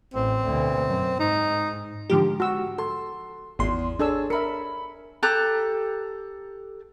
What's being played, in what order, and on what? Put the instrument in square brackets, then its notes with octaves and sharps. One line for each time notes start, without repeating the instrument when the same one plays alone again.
[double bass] A1 [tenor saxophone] C4
[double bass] D2 B2
F#2
[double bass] G#2 [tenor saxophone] D#4
[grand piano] G#2 [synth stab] D3 F3 G4
[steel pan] F#4 E6
[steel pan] A4 [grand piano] C6
[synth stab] G#1 C6 [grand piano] E2
[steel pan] D4 A4 E6 [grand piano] G#4 C#5
[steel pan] A#4 E5 [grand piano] B5 C#7
[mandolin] G4 A4 A#5 F#6